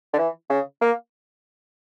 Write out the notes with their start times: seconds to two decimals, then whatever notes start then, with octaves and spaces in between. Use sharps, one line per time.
0.13 D3
0.18 E3
0.50 C#3
0.81 A#3